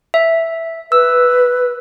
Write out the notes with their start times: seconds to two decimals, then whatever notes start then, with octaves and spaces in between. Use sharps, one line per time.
0.14 E5
0.92 B4 E6